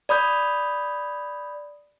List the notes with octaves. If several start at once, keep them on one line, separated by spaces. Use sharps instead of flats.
D5 B5 D#6 G6